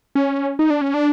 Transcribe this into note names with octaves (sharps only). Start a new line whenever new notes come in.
C#4
D#4
D4
C#4
D4